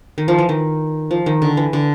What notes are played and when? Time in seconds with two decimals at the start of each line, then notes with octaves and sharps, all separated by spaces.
0.18 D#3
0.28 F3
0.39 E3
0.49 D#3
1.11 F3
1.26 D#3
1.42 D3
1.57 E3
1.73 D3